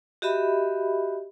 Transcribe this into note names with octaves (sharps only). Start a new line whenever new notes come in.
F#4 G4 D#5 E5 B5